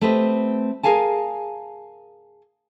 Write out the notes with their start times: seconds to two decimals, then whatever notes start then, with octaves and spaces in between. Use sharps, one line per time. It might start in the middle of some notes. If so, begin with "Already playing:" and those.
0.01 A3 C4 G4 B4 D#5
0.83 G#4 A#4 F5 G#5 A5